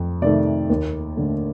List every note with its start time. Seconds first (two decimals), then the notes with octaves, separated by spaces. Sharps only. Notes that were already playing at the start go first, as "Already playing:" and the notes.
Already playing: F2
0.22 C3 D#3 A3 D5
0.70 D#2
1.17 D3 A3